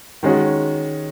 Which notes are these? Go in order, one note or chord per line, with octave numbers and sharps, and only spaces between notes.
D#3 G#3 C#4 F#4